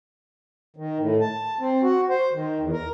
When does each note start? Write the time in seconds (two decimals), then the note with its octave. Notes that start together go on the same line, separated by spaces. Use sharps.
0.77 D#3
0.99 A2
1.21 A5
1.60 C4
1.82 F#4
2.09 C5
2.33 D#3
2.59 E2
2.72 A#4